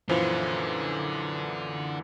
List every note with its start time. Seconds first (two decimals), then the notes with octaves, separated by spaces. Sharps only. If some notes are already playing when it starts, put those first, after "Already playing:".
0.09 F#2 A#2 D3 E3 F3 E4